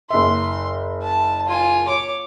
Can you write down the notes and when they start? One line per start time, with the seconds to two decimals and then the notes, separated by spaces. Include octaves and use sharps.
0.10 F#1 E5 C6
1.02 A5
1.47 F4 G#5
1.88 C#5 D6